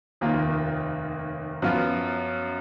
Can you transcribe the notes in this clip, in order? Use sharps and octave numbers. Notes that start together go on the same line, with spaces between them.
F1 D#2 D#3 A#3 F4
F#2 F3 B3 F4